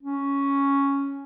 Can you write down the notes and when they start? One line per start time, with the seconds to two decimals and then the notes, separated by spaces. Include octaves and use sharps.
0.03 C#4